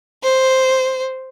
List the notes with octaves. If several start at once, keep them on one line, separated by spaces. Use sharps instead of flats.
C5